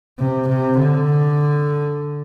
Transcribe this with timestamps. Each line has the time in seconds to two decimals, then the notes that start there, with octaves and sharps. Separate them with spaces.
0.19 C3
0.48 C3
0.78 D3